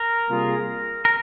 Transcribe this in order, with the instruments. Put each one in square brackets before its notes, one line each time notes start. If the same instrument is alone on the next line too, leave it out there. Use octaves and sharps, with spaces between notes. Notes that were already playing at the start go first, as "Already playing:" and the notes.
Already playing: [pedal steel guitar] A#4
[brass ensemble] C3 G3 A#3 F4 G#4
[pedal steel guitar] A#4